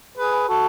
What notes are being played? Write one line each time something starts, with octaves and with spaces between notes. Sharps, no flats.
G#4 B4
F#4 A4